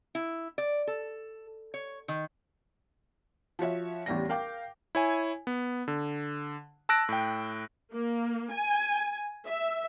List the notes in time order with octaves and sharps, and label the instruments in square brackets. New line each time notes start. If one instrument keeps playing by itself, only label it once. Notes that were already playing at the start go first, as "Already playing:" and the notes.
[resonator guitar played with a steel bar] E4
D5
A4
C#5
D#3
[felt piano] F3 F#4 C#5 E5
A1 E2 G3 D4 A#6
A#4 F5 G5 D6 G6
[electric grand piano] E4 C#5 G#5
B3
D3
A5 E6 F#6 A#6 D7
A2 G5
[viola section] A#3
G#5
E5